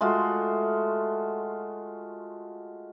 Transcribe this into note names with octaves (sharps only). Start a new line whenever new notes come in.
G#3 A3 F4 F#4